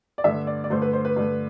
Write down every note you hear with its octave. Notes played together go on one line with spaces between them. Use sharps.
D5
G2 D3 A3 E5
D5
D5
G2 D3 A3 C5
B4
C5
B4
G2 D3 A3